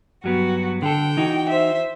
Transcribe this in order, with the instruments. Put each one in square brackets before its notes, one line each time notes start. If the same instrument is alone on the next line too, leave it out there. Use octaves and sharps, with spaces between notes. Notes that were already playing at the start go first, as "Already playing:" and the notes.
[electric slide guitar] G2 F#3 B3 [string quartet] F#4
[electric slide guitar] D3 A4 [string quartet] G5
[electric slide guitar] E3 D#4 F#4
[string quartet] C5 E5